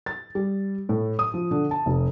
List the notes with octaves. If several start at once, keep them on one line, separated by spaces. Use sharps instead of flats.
A6
G3
A2
D#6
F3
D3
A5
F1